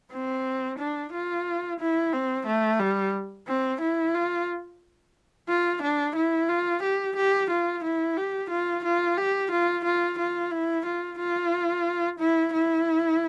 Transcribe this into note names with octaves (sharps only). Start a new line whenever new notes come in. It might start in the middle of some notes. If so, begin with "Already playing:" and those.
C4
D4
F4
E4
C4
A3
G3
C4
E4
F4
F4
D4
E4
F4
G4
G4
F4
E4
G4
F4
F4
G4
F4
F4
F4
E4
F4
F4
E4
E4